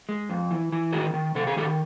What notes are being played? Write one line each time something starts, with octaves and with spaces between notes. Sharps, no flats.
G#3
F2
E3
E3
D#3 F#4 G#4
D#3
C3 A4
G#4
D#3 G4 A4